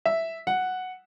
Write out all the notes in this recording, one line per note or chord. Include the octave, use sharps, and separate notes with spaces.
E5
F#5